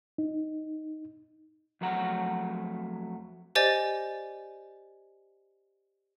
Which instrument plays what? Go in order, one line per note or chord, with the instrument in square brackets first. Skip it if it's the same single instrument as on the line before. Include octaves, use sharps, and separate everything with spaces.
[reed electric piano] D#4
[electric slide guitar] F2 F#3 A3 F#5 A#5
[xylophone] G4 C5 D5 D#5 G#5 A6